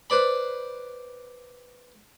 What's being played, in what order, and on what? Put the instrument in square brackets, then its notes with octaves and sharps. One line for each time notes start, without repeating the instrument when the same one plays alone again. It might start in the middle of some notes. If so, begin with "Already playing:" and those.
[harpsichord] B4 C5 D5 B5